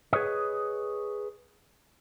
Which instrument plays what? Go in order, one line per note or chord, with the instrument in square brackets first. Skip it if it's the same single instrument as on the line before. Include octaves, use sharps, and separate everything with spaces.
[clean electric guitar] G#4 B4 C#5 D#5